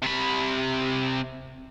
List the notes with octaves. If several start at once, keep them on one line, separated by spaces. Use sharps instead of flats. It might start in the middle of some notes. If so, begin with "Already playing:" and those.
C3 B5